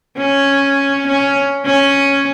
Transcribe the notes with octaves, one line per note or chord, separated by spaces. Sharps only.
C#4
C#4
C#4